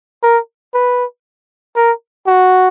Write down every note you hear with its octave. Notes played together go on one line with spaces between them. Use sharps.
A#4
B4
A#4
F#4